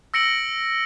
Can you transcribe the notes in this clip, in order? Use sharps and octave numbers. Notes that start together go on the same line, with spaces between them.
E6 A#6 C#7 D7 F#7